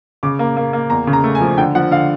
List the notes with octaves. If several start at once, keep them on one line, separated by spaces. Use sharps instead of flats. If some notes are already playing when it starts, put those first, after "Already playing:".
C#3 D6
A#3
A#3
A#3
E2 A#5
C#3
A#5
A3
G#5
F3
D3 G5
F3 F#5
D3 F5